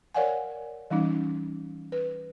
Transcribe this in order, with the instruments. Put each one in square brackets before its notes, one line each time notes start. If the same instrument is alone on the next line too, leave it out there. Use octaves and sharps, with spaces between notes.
[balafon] A#4 C#5 D5 F5 F#5 G#5
E3 G3 C#4 D#4
B4